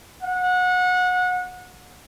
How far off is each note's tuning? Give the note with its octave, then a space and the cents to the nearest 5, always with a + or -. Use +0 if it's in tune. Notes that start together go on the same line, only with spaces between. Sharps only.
F#5 -25